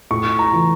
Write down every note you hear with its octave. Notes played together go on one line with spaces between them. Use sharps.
A2 C#6
A#5
E3